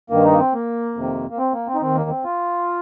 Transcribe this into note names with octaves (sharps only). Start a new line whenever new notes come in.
G2 D#3 A#3
D#4
A#3
C4
A#3
F2 C3 D#3
A#3
C4
A#3
C4
D#4
D#2 D#3 C4
A#3
C4
F4